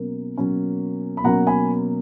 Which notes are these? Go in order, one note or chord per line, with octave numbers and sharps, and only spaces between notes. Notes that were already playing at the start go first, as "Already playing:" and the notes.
Already playing: B2 F#3 A#3 C#4 A#4
B2 F#3 A#3 C#4
B5
B2 F#3 A#3 C#4 F#5 A#5
G#5 B5